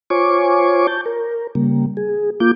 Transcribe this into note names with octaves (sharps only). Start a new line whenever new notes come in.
F4 C5 C#5 G#5 C#6 D6
A5 G6
A#4
C#3 G3 A#3
G#4
A#3 F4 D6 G6